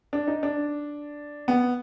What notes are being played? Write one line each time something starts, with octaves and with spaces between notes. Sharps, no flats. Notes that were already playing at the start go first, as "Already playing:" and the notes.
D4
D#4
D4
B3